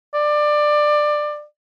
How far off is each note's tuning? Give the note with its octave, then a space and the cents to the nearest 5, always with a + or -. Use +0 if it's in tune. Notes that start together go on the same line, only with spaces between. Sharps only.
D5 +20